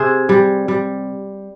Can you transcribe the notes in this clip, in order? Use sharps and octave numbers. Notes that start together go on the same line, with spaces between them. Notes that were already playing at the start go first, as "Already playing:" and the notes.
Already playing: C3 G#4 C5
G3
G3